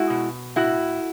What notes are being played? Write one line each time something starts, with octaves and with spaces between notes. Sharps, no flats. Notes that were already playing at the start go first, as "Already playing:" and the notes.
Already playing: G#3 E4 F#4
B2
A2 E4 F#4